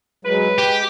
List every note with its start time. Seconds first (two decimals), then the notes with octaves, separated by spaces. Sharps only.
0.25 F#3 G#3 B4
0.58 G#3 G4